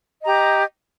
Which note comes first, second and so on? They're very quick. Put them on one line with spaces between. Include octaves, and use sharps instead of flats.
D#5 A#5 G4